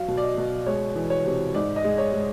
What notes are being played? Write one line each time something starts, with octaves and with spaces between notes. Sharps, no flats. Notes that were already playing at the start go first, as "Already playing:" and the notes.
Already playing: F#3 F5
B2
D5
D#5
B2
G#3 C#5
E3
C#5
C3
G#2 D5
D#5
G#3
C#5
G#3